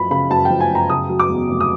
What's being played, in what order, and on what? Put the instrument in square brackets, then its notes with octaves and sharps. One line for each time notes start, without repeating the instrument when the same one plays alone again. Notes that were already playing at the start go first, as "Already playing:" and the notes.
Already playing: [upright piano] F#2 F3 B5
C#3 B5
F#2 A5
G5
F3
G#5
F#2
A#5
C#3 D#6
F#3
D6
E2
F1
D#6